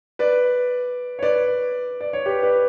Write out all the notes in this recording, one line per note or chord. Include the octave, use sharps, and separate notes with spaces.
B4 D5
C#5
B4 D5
D5
C#5
G4 B4
B4 D5